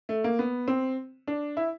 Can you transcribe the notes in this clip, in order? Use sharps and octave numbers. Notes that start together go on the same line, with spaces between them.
A3
A#3
B3
C4
D4
E4